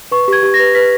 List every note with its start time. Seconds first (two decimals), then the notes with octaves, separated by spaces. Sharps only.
0.11 B4 C#6
0.28 G4 G#6
0.43 G4
0.54 A#6
0.60 B4
0.75 B4 B6